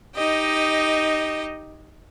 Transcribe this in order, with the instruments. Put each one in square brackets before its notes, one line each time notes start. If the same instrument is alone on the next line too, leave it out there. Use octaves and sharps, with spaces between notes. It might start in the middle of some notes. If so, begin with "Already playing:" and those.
[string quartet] D#4 G4 D#5